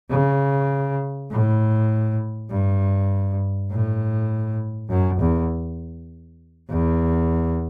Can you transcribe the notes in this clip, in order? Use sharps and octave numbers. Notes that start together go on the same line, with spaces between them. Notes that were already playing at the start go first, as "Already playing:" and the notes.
C#3
A2
G2
A2
F#2
E2
E2